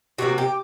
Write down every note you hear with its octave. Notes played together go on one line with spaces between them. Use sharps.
C3 F3 A#3 F#4
G4